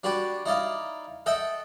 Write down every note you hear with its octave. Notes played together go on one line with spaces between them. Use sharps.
D4 F#4 G4 B4 A5 D6
D#4 E4 D5 D#5 F5
A4 D#5 E5 F#5 G5 A5